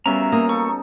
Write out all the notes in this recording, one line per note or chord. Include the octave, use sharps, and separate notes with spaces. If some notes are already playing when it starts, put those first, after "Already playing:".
C#3 F#3 G3 B3 C#4 A#4 E5 A#5
A#3 D#6
D#4 A4 C#6